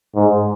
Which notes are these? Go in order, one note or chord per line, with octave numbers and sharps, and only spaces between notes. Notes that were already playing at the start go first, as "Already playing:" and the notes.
G#2